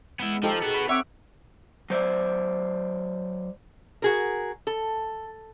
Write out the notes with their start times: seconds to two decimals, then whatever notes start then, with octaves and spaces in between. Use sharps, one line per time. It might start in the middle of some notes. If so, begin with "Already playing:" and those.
0.20 G#3 B3 E4
0.43 F3 D#4 G4 A4
0.62 B3 F#4 G#4
0.74 B5
0.89 C4 C#5 E5 F#5 D6
1.90 F#3 C5 D5 E5
4.02 F#4 G#4 A#4
4.67 A4